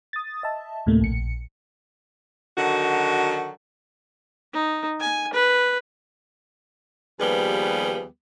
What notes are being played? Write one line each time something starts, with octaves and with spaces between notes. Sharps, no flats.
D#6 A6
D#5 E5 A5
D2 A2 C3 A3 A#3
A#1 C#7
D3 D#3 F#3 F#4
D#4
G#5
B4
D#2 F3 G3 B3 G#4 B4